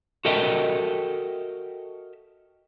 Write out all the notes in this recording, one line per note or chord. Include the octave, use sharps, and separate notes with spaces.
F#4 A4 A#4 D#5 E5 G5